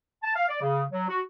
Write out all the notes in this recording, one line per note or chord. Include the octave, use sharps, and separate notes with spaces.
A5
F5
D5
C#3
F#3
F#4